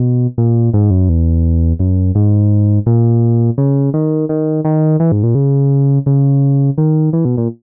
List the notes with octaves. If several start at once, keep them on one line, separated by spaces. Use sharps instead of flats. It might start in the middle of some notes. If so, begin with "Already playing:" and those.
Already playing: B2
A#2
G#2
F#2
E2
F#2
G#2
A#2
C#3
D#3
D#3
D#3
E3
G#2
A#2
C#3
C#3
D#3
E3
B2
A#2